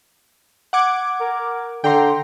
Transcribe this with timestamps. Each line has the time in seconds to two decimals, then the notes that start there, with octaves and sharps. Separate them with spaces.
0.73 F#5 D6 G#6
1.20 A#4
1.84 D3 G5 A#5 C6